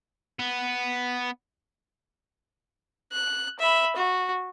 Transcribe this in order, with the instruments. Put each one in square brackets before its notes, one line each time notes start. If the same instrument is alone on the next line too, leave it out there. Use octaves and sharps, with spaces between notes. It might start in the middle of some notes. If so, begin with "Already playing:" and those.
[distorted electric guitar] B3
[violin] F#6
E5 B5
F#4